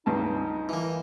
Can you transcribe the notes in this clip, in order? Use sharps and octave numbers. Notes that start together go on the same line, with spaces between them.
C#2 G2 D#4 A5
E3 A#3